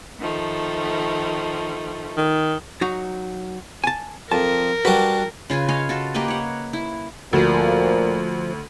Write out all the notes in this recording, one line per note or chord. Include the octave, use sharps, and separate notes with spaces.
D#3 F3 A3
D#3
F#3 D#4 F#4
G#5 A5
F2 A#4 A5
G3 D4 F#4 B4
C#3 F4 B4 G#5
C#5 D#5 F5 G#5
F4 F#4 A4
A#3 G4 B4 D#5
C#5 F#5
E4
D2 A#2 F3